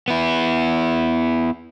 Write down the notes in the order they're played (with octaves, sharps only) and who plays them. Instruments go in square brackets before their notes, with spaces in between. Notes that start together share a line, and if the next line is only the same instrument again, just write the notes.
[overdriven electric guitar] B3 E4